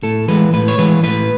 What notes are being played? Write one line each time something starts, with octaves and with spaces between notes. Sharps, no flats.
A2 A4
E3 G#3 B4
A2 B4
C#5
E3 G#3 B4
A2 B4